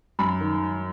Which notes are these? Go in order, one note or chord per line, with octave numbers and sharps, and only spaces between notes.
F#2 B5
D#3